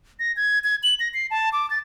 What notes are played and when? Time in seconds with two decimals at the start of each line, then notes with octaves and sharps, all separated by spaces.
0.19 A#6
0.36 G#6
0.64 G#6
0.83 F#7
1.00 A#6
1.14 C7
1.31 A5
1.52 D6
1.70 A6